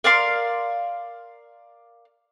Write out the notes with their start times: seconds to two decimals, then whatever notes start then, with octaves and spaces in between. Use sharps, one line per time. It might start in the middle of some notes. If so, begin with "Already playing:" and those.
0.04 A#4 D5 F5 C6